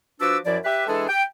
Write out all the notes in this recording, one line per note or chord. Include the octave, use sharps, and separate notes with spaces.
F3 D4 F#4 B4 D6 E6
F#2 F3 E4 D5
G4 B4 E5
E3 G#3 D4 G#4 A4
G5